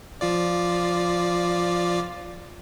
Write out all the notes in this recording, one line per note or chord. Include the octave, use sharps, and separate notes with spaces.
F3 F4 D5